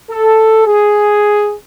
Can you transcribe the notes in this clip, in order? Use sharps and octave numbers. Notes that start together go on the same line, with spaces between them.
A4
G#4